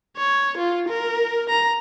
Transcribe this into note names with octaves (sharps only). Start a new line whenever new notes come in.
C#5
F4
A#4
A#5